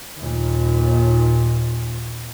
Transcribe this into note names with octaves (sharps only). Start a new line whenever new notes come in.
D#2 A#2